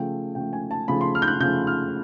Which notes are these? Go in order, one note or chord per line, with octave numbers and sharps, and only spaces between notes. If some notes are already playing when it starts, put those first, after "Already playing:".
Already playing: C#3 F3 A3 G5
C#3 F3 A3 G5
G#5
A5
C#3 F3 A3 B5
C6
F6
G6
F#6
C#3 F3 A3 G6
F6